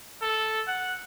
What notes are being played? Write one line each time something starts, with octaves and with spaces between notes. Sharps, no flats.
A4
F#5